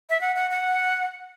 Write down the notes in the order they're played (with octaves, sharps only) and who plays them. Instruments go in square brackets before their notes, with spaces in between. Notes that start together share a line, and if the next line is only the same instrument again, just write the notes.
[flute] E5
F#5
F#5
F#5